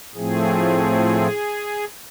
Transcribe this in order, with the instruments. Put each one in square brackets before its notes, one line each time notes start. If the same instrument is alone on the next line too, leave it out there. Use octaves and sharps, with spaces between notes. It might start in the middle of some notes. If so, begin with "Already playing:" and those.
[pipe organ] A2 F3 A3 C4 G#4